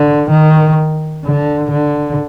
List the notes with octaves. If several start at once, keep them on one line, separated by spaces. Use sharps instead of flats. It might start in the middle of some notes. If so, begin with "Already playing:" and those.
Already playing: D3
D#3
D3
D3